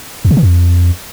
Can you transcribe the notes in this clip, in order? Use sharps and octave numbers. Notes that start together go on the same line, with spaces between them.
E2
C3
D#3
F2